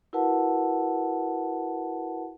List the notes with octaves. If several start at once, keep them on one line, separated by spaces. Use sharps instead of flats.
E4 F#4 A#4 B4 F#5 A5